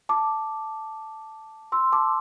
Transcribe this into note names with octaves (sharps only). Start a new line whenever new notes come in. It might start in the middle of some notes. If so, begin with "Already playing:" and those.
A5 D6
C6 E6
A5 D6